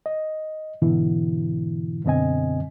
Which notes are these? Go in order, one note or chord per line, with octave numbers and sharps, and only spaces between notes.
D#5
G#2 B2 D3 E3 E4
F#2 B2 D3 C4 D#5 G#5